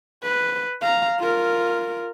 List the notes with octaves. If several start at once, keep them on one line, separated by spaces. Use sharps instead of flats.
B4
F5 A#5
F4 A#4